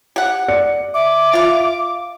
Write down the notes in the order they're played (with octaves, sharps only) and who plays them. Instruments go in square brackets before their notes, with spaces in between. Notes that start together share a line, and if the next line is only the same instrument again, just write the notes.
[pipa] G4 F#5
[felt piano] D5 C#7
[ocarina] E5 [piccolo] D6
[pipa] F4 F5